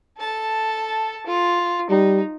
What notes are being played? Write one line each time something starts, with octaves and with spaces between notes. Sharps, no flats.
A4 A5
F4
G3 D#4